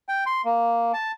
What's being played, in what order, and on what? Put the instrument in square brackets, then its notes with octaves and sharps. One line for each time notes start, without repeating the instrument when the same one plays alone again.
[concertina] G5
C6
A#3
A5